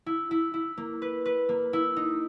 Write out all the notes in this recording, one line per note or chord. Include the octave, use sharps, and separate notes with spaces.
E4
E4
E4
A#3
B4
B4
A#3
E4
D#4